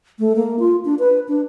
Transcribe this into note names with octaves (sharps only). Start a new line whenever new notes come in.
A3
A#3
F4
D4
B4
D4